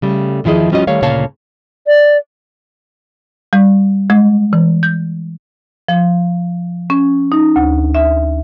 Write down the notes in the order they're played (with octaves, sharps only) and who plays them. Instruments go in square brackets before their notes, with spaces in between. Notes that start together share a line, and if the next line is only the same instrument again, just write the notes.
[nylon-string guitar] C#3 G3 A3
E2 D#3 F3 E4 G#4 D#5
F3 G3 C#4 F4 F#4 D#5
D#3 G3 A3 C#5 F5
D2 A#2 C#3 C#5 F5 A5
[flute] D5
[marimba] G3
G#3
E3
G6
F3
C#4
D#4
D2
E5